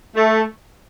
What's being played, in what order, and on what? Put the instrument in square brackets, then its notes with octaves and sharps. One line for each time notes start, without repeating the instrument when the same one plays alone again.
[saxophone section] A3